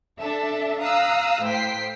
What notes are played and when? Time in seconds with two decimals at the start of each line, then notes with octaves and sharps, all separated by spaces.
0.21 D4 A4 E5
0.81 F5 A#5 D#6 E6 F#6
1.44 A2 C5 G5 B6 C7